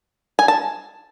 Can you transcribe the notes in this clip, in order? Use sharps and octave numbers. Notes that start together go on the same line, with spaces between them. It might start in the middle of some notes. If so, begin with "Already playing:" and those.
G#5
A5